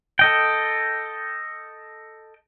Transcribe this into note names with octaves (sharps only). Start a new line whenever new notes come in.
A4 D#5 G5